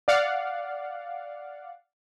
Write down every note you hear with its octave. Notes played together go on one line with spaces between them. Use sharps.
D5 F5 F#5